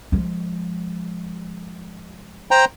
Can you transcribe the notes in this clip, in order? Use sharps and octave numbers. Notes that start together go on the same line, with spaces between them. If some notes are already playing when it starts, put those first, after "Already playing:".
F3 G#3
C5 G5 A#5